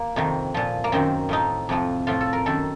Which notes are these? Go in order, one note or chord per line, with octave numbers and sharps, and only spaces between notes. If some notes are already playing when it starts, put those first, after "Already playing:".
Already playing: A#3
F2 C3 D#3
A#2 F3
A#3
F#2 D#3 C4
A2 F3 D#4
F2 C3 F3
A2 F3 F4
A4
A#4
F#2 D#3 A4